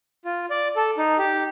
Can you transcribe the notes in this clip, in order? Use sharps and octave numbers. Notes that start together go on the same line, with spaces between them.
F4
D5
A4
D#4
G4